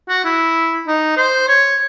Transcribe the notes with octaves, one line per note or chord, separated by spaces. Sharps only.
F#4
E4
D#4
C5
C#5